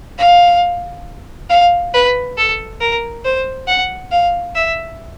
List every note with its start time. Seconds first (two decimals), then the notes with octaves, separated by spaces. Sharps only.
0.18 F5
1.50 F5
1.94 B4
2.37 A4
2.80 A#4
3.25 C5
3.67 F#5
4.11 F5
4.55 E5